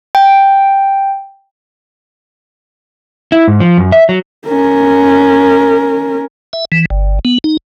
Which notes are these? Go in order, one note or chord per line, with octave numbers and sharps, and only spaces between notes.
G5
E4
G#2
F3
F#2
E5
F#3
C#4 A#4
E5
E3
G1
B3
D#4